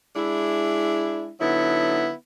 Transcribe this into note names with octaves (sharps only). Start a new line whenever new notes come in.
G#3 D4 E4
D3 F#3 B3 D#4 E4